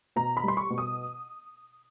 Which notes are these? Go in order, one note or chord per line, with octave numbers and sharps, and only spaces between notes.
B2 A#5
B5
G3 C6
C#6
B2
D#6